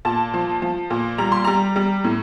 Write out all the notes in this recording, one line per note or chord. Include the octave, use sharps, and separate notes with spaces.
A#2 A5
F3
F3
A#2
G3 A#5
C6
G3 A#5
G3
A2